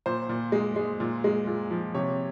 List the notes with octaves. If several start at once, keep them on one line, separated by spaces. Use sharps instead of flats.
A#2 C5
A#2
G#3
G#3
A#2
G#3
A#2
F3
C3 C#5